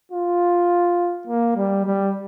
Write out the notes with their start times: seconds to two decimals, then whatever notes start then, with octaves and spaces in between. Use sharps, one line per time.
0.12 F4
1.27 A#3
1.56 G3
1.85 G3